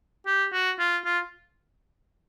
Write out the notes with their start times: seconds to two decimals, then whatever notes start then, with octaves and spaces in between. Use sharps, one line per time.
0.26 G4
0.52 F#4
0.79 F4
1.05 F4